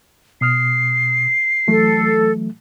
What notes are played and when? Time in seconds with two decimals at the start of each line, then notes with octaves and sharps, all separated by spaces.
0.41 B2 D#6 F6 C7
1.68 E3 F#3 A3 A4